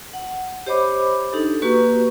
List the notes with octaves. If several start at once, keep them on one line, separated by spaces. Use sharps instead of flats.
F#5
G4 C5 C#5 D#5 B5 D6
D4 D#4 G4 A4
A#3 F#4 G4 B4 A#5 C#6